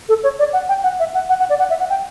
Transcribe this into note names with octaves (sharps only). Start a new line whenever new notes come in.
A4
C#5
D5
F#5
G5
F#5
E5
F#5
F#5
F#5
D5
F#5
E5
F#5
G5